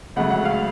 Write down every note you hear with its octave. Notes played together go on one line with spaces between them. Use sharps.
C#2 C#3 F#3 A3 F#5
F#5
F5